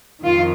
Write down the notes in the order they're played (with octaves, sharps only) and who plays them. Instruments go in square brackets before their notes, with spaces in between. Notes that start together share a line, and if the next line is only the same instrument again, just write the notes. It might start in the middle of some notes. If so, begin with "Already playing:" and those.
[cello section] F2 D#3 F4